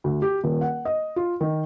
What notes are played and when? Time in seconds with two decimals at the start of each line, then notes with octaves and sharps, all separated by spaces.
0.04 D2
0.22 G4
0.44 D#1
0.61 F#5
0.85 D#5
1.16 F4
1.41 D#3